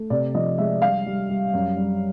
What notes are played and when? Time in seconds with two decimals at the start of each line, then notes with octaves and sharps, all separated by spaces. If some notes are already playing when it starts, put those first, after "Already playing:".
Already playing: A3
0.10 C3 D5
0.35 F3 D#5
0.58 G#3 E5
0.82 G3 F5
1.06 G3
1.30 G3
1.53 F#2
1.77 G3